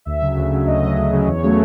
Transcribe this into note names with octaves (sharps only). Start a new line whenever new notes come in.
D2 E5
C#3 F#3
D2
C#3 F#3
D2 D#5
C#3 F#3
D2
C#3 F#3
E2 C#5
C#3 F#3 A3